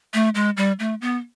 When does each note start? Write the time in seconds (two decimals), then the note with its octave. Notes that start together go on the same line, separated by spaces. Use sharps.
0.14 A3
0.35 G#3
0.57 G3
0.79 A3
1.01 B3